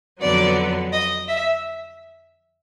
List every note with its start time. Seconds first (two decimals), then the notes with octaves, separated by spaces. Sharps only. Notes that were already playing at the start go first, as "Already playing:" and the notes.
0.21 F2 D3 F#3 B3 D5
0.92 D#5
1.28 E5